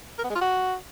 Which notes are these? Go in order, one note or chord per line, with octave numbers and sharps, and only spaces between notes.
A#4
B3
G#3
F4
F#4